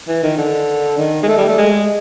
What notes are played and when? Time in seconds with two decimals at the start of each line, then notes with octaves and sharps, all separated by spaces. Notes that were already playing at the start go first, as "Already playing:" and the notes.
0.08 E3
0.23 D#3
0.38 D3
0.98 D#3
1.23 G#3
1.28 A3
1.38 G3
1.48 A3
1.58 G#3